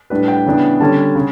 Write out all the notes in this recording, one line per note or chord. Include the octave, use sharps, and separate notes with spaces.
A2 G3 D4 B4
G5
C#3 E3 B3 D4
D3 G3 C#4 A5
C#3